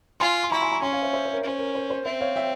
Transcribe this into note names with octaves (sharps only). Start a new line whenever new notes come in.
F4 G#5 C6
C6
E4 A#5 C#6
G#5 C6
A#5 C#6
C#4 G#5 C6
C#5 F5
C5 E5
C5 E5
C5
A#4 C#5
C#4 C5
A#4
C5
C5
C4 C5 E5
C#5 F5
E5 G5